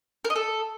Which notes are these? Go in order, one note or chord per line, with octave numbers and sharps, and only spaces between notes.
A#4
D#5
A4